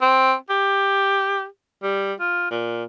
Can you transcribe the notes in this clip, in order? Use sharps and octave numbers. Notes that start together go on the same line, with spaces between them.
C4
G4
G3
F4
A#2